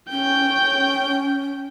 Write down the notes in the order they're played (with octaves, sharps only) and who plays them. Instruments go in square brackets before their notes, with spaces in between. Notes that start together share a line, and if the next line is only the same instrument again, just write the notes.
[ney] C#4 [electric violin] G5 G6